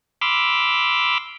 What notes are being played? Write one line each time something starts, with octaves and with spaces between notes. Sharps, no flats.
B5 C6 D6 E6 F6